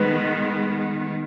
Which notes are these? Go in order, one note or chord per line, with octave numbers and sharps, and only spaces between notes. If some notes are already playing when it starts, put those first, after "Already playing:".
Already playing: D#3 G#3 B3 B4